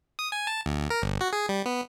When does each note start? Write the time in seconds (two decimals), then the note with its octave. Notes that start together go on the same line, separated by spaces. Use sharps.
0.19 D#6
0.32 G#5
0.47 A5
0.66 D2
0.90 A#4
1.02 G1
1.21 F#4
1.33 G#4
1.49 G3
1.66 B3